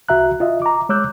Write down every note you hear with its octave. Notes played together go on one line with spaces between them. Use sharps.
C2 F#4 E5 A#5 F#6
F4 D#5 E5
A#5 D6
G#3 C#5 D6 E6 F#6 G6